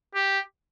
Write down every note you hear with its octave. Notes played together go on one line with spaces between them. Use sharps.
G4